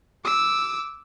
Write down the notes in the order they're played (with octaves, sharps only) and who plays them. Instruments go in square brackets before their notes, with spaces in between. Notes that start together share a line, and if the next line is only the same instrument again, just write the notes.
[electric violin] D6 E6